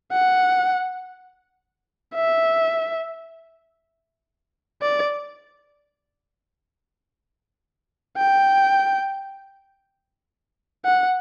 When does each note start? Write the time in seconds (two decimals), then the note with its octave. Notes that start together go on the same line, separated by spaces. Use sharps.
0.12 F#5
2.14 E5
4.82 D5
8.17 G5
10.85 F#5